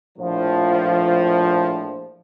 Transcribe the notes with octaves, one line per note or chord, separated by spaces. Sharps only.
A#1 A2 F3